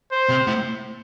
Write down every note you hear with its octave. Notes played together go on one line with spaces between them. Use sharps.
C5
C3
A2